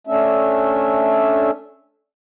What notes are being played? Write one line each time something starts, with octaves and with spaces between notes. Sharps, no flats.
A3 C#4 D4 E5